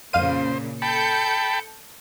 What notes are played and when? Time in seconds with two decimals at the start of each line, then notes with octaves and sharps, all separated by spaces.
0.13 F2 A#2 C#3 A#3 C5 F5 D#7
0.82 A4 G5 A5 B5 G6 C#7